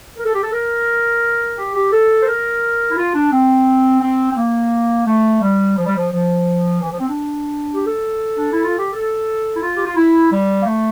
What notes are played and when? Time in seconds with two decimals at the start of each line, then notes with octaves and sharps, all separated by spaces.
0.16 A#4
0.24 A4
0.33 G4
0.42 A4
0.52 A#4
1.56 G4
1.73 G4
1.91 A4
2.22 C5
2.26 A#4
2.90 E4
2.97 F4
3.14 D4
3.32 C4
4.01 C4
4.31 C4
4.37 A#3
5.05 A3
5.41 G3
5.76 F3
5.86 G3
5.95 F3
6.11 F3
6.80 E3
6.90 F3
6.99 C4
7.07 D4
7.73 G4
7.85 A4
8.36 D4
8.51 E4
8.64 F4
8.77 G4
8.91 A4
9.55 E4
9.61 F4
9.75 G4
9.85 F4
9.95 E4
10.30 G3
10.60 A#3
10.66 A3